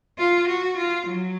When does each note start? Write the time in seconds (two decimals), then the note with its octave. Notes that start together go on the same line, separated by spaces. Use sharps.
0.18 F4
0.48 F#4
0.77 F4
1.07 F#3